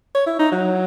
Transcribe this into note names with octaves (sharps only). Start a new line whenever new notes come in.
C#5
E4
D#4
F#3